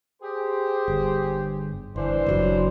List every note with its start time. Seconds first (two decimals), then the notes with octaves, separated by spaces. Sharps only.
0.22 G4 G#4 C5
0.88 G1
1.96 G1 E3 D4 C5
2.27 F#1 C3 F#3